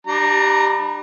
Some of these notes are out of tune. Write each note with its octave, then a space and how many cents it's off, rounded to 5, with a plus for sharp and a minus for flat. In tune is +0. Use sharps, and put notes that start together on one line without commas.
G3 +0 D4 +40 A#5 +0